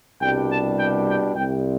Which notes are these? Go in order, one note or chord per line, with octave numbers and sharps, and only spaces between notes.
C2 B2 G3 D4 G5
A5
G5
G5
C2 C3 G3 G5